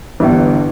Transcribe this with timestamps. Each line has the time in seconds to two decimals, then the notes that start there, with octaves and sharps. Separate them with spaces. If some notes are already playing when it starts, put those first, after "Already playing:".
0.20 G1 G2 E3